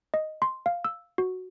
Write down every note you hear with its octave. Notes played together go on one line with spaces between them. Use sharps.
D#5
C6
F5
E6
F#4